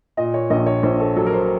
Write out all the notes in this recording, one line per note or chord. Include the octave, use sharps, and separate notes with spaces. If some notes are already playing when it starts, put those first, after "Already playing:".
A#2 D#5
C#5
A#1 D#5
C#5
A#1 C5
A4
F#3 A4
A#4
C5